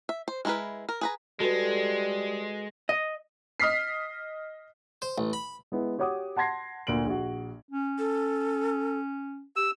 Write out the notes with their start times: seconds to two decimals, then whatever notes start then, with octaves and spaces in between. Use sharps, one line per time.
0.09 E5
0.28 C5
0.45 G#3 D4 E4 A#4 B4
0.89 A#4
1.01 G#4 B4 A#5
1.40 G3 G#3 F#4 A4 B4
2.89 D#5
3.60 D#5 D#6 F6 B6 C7
5.02 C5
5.18 A1
5.33 B5
5.72 G#3 B3 E4
5.98 F#4 G4 C#5 F#5 D6 D#6
6.37 F#5 A5 C6 G#6 A#6 C7
6.87 D2 A#2 D7 F#7
7.06 A#1 F#4
7.70 C#4
7.99 A4
9.56 G4 E6